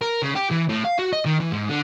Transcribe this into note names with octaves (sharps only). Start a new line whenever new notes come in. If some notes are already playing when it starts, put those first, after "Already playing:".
A#4
C#3
G4
E3
A2
F5
F#4
D#5
D#3
E3
G#2
D3